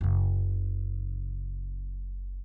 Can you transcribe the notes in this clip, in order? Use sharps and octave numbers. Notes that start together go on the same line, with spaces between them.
F#1 C#3